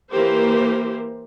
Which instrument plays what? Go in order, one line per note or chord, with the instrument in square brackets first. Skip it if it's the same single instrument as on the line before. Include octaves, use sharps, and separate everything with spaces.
[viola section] E3 A#3 G4 A#4 C5